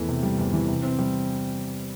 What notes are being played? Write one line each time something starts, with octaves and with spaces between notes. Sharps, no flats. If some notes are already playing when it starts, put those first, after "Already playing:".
Already playing: E2 E3 A3
C3
G3
E2
E3
C3
C4
G3